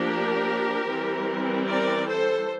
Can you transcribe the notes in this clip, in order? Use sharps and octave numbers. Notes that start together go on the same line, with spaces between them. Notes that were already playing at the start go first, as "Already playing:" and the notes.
Already playing: F3 A#3 D4 G4 A#4
E3 G3 C4
A#4 D5
A4 C5